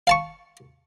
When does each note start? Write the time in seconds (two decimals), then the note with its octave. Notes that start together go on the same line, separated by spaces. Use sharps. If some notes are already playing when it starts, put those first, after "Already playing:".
0.07 F5 A5 C#6